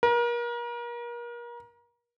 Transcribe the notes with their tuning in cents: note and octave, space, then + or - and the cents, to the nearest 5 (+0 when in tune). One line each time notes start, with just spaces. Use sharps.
A#4 +35